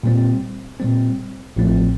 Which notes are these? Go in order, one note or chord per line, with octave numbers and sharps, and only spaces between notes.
A#2 G3 C4
A#2 G3 C4
A1 A2 F3 A3 C4